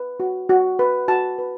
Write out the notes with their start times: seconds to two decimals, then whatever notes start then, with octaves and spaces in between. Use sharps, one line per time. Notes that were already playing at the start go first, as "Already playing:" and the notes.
Already playing: B4
0.20 F#4
0.49 F#4
0.79 B4
1.08 F#4 A5
1.38 B4